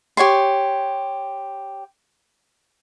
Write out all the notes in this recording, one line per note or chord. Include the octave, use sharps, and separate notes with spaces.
G4 C#5 G#5 C6